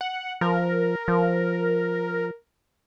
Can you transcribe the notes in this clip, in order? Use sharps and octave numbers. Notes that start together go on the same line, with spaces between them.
F#5
F3 A#4
F3